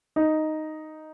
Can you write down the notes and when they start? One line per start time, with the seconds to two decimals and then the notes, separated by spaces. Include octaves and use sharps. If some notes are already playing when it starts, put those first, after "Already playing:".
0.16 D#4